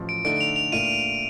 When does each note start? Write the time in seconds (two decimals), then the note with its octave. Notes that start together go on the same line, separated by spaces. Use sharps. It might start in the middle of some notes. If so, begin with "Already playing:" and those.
Already playing: A1 A2 F3
0.09 D7
0.24 D3 A3 D#4 A4 D5 D7
0.41 F7
0.56 F7
0.72 A#2 A3 D4 F4 D#7